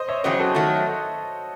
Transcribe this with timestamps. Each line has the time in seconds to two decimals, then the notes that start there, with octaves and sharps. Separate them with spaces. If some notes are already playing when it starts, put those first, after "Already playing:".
Already playing: C5 D#5
0.09 C#5 E5
0.24 E2 C#3 F#3 C4 C5 D#5
0.40 F#4 A4
0.55 D#3 F#3 A3